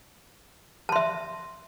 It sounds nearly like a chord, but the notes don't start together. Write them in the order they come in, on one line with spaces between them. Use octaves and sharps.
A5 C6 E5